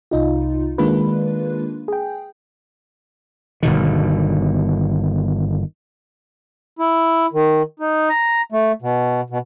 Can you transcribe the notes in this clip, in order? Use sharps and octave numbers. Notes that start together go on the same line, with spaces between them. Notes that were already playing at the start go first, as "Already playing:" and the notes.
C2 D#4 F4
D#3 G#3 A#3 D4 F4 B4
G#4 G5
G1 B2 D#3
E4
D#3
D#4
A#5
A3
B2
B2